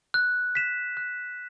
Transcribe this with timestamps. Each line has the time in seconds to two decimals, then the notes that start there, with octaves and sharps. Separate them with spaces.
0.14 F#6
0.55 B6 E7
0.97 F#6